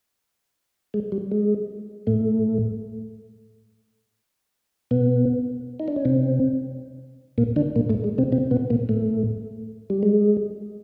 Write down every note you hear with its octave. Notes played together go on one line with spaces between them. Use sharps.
G#3
G3
G#3
A2 A3
B2 B3
D#4
D4
C#4
C3 C4
A#2 A#3
D3 D4
A#2 A#3
A2 A3
G#3
C3 C4
C3 C4
B2 B3
A#2 A#3
A2 A3
G3
G#3